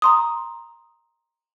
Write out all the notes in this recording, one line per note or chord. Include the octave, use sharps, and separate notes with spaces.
A#5 C6 D#6